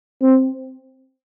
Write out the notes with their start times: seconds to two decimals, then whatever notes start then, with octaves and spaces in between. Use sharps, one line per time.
0.22 C4